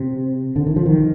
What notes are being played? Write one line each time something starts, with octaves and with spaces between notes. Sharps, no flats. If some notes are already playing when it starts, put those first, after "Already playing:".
Already playing: C3
D3
D#3
F3
D#3